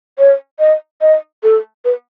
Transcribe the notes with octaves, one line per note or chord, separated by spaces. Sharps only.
C#5
D#5
D#5
A4
B4